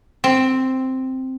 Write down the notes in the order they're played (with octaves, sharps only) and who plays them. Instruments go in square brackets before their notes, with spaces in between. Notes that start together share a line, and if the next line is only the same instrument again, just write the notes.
[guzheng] C4